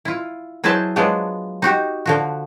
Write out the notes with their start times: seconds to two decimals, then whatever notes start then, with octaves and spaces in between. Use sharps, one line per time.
0.05 E4 F4
0.64 F#3 E4 G#4 B4 C5 A5
0.96 F3 F#3 G#3 B3 D4
1.62 D#4 F#4 G4
2.06 D3 F3 F#4